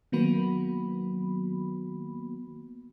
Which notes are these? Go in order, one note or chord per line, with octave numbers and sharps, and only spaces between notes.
D#3 F#3 A#3 B3 F#4 B5